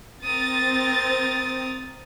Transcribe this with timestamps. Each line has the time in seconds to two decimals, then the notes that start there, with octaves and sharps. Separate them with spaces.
0.24 C4 A#4 D#6 A6